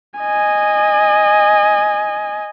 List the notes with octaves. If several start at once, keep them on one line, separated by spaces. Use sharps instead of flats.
D#5 G#5